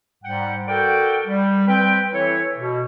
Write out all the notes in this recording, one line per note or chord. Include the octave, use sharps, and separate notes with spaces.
G#2 G3 F#5 G5
F#4 A4 A#4 D5 F#5 G5
G3
C4 B4 G5
E3 E4 A4 B4 C#5
B2